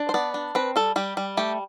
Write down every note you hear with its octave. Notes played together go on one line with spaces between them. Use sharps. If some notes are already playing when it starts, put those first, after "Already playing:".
Already playing: D4
C5
B3 D5
D4
C4 B4
G3 A4
G3 G4
G3
A3 G4